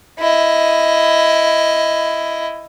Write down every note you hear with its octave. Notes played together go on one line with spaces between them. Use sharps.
E4 D#5